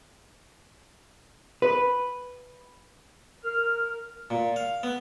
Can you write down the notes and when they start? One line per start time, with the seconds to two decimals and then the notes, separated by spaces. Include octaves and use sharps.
1.62 B4
3.44 A#4 F6
4.30 A#2
4.56 F5
4.83 B3